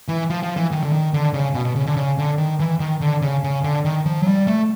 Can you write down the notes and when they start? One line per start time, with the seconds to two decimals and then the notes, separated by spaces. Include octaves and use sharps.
0.08 E3
0.30 F3
0.43 F3
0.56 E3
0.71 D#3
0.83 D3
0.93 D#3
1.13 D3
1.33 C#3
1.54 B2
1.65 B2
1.75 C#3
1.87 D3
1.97 C#3
2.18 D3
2.38 D#3
2.60 E3
2.80 D#3
3.01 D3
3.22 C#3
3.44 C#3
3.64 D3
3.85 D#3
4.06 F3
4.22 F#3
4.27 G3
4.47 A3